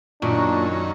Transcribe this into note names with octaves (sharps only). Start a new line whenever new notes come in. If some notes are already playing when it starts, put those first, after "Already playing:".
F#2 A#2 D#3 C#4 D4